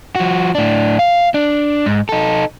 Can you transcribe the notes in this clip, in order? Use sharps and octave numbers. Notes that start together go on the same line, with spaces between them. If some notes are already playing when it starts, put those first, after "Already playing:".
F3 F#4
A2 D4
F5
D4
G#2
D#4 A4